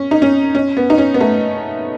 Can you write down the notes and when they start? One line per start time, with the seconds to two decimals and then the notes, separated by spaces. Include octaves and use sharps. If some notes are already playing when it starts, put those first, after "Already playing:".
Already playing: C#4
0.11 D#4
0.22 C#4
0.55 C#4
0.77 B3
0.90 D#4
0.98 C#4
1.14 B3
1.21 A3